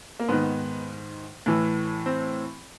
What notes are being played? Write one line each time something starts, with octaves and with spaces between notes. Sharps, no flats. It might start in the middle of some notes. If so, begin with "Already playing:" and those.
A#3
G#2 D#3 B3
A2 E3
C4